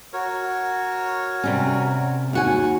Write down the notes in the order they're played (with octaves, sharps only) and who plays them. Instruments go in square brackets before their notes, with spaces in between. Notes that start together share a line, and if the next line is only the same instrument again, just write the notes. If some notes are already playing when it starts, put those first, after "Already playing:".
[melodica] F#4 A#4 C#5
[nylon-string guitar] C3 G3 C#4
D#2 F#4 G#5